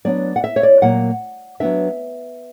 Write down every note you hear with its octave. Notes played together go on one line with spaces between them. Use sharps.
F#3 B3 D4 D5
F#5
E5
C#5
D5
A#2 F#3 A#3 F#5
F#3 B3 D4 E5